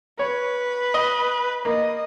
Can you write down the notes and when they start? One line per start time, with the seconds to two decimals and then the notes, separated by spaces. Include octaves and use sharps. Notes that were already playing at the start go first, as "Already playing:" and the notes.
0.19 B4 C#5
0.94 D#5
1.65 A#3 D#5